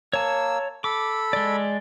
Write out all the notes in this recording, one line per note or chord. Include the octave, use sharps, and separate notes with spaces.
A#3 C#5 A5 E6
A4 B5 D6
G#3 D5